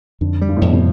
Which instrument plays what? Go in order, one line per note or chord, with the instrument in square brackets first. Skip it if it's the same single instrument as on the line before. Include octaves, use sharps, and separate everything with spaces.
[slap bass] F2 [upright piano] D3
[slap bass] G3
[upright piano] G2
A2
[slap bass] F2 [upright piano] B2
[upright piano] C3